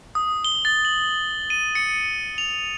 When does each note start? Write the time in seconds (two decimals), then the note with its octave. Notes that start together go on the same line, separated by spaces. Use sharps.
0.15 D#6
0.45 G7
0.65 A6
0.85 F#7
1.50 D#7
1.75 C#7
2.38 F7